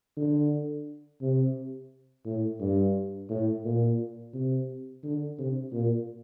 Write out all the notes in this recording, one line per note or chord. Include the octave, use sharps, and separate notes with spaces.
D3
C3
A2
G2
A2
A#2
C3
D3
C3
A#2